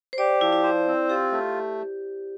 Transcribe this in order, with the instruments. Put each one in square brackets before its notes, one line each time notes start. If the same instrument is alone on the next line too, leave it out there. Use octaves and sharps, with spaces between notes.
[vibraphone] C5
[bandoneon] G4 [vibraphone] D5
[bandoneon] F3 [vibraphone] E4
[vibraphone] E4
[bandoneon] C5
C4
[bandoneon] F4 [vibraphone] G4
[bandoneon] A3